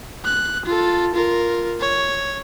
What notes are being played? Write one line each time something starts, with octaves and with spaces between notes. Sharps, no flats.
F#6
F4 A4
F4 A#4
C#5